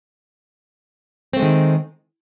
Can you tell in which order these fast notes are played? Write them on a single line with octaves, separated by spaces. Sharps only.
C4 A3 G#3 D#3